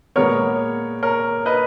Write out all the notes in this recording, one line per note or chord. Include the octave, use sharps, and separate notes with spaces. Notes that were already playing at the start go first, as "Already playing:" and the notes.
A#2 G#3 B3 A#4 C#5
A#4 C#5
B4 D#5